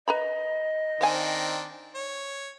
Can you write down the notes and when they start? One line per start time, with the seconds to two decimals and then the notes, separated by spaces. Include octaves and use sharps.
0.08 B4 D#5 A#5 B5
1.01 D#3 C4 D4 C5 F5 G#5
1.95 C#5